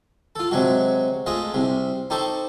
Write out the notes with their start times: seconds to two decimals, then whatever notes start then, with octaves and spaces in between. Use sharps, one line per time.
0.35 F4 A4
0.51 C3 F#3 G#3 F#4
1.26 G#3 A3 F4 D#5
1.54 C2 C3
2.10 D#4 G4 A4 C5 C#6